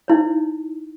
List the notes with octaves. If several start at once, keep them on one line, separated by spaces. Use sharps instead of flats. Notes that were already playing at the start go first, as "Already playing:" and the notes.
D#4 E4 C#5